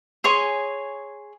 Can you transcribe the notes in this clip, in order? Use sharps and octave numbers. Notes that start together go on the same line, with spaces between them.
G#4 C#5 G#5 C6